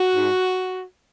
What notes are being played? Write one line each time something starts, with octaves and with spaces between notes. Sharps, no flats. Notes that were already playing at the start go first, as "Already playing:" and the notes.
Already playing: F#4
G#2